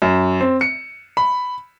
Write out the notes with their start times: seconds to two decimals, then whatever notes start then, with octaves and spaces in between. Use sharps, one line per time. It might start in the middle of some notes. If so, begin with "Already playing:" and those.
0.02 F#2
0.41 C4
0.61 C#7
1.17 B5